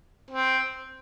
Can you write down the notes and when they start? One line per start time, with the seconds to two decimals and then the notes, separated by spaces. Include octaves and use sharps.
0.30 C4